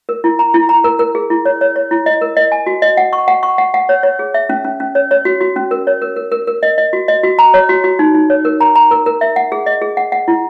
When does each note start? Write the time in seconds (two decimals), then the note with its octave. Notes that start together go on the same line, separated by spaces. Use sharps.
0.09 A#4
0.24 E4
0.39 A#5
0.54 E4
0.69 A#5
0.84 A#4
0.99 A#4
1.15 G#4
1.30 E4
1.45 C#5
1.61 C#5
1.76 C#5
1.91 E4
2.06 D#5
2.21 A#4
2.37 D#5
2.52 G#5
2.66 F#4
2.82 D#5
2.97 F#5
3.13 C#6
3.28 F#5
3.43 C#6
3.58 F#5
3.74 F#5
3.89 C#5
4.03 C#5
4.19 G#4
4.34 E5
4.49 C#4
4.64 C#4
4.80 C#4
4.95 C#5
5.11 C#5
5.25 F#4
5.41 F#4
5.56 C#4
5.71 A#4
5.87 C#5
6.02 A#4
6.16 A#4
6.32 A#4
6.47 A#4
6.63 D#5
6.78 D#5
6.93 F#4
7.08 D#5
7.23 F#4
7.39 A#5
7.54 C#5
7.69 F#4
7.84 F#4
7.99 D#4
8.14 D#4
8.30 C#5
8.45 A#4
8.61 A#5
8.75 A#5
8.91 A#4
9.06 A#4
9.21 E5
9.36 F#5
9.52 G#4
9.66 D#5
9.82 G#4
9.97 F#5
10.12 F#5
10.28 E4